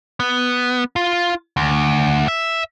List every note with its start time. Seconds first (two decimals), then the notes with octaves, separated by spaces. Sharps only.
0.20 B3
0.96 F4
1.57 D2
2.28 E5